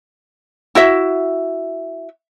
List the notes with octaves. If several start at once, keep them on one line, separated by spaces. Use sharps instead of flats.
E4 F#4 E5